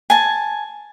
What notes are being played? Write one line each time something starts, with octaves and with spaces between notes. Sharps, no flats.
G#5 A5